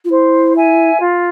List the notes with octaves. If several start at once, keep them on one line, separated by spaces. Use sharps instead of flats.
F4
E4 C5
E5 G#5
F4